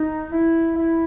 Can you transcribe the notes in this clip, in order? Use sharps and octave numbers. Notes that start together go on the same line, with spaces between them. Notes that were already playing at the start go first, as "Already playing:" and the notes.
Already playing: D#4
E4
E4